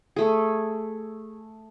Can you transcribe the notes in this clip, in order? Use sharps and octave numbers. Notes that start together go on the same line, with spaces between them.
A3 G#4